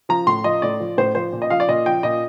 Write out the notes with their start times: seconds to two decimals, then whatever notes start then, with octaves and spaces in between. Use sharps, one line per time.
0.09 F3 A#5
0.27 A2 C6
0.44 F3 D#5
0.62 A2 D5
0.80 F3
0.98 A2 C5
1.15 F3 C5
1.33 A#2
1.42 D#5
1.50 F3 F5
1.60 D5
1.68 A#2 D#5
1.85 F3 G5
2.03 A#2 D#5